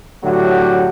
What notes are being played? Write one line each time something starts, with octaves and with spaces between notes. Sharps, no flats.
A2 D3 F#3 A3 F#4 G4